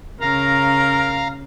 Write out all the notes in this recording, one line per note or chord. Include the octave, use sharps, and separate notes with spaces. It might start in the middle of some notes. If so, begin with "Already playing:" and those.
C#3 A#4 F5 A#5